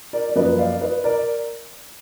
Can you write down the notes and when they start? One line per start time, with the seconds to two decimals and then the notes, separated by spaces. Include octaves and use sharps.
0.13 A#4 D5
0.29 D5
0.36 F#2 F3 A#3 B4 D#5
0.59 D5 F5
0.81 B4 D#5
1.04 A#4 D5